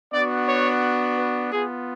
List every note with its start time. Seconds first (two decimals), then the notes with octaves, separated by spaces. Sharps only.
0.13 B3 D4 F#4 D5
0.47 C#5
1.17 B4
1.52 B3 F4 G#4